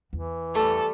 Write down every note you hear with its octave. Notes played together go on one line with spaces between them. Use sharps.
E2 E3
G3 A3 A4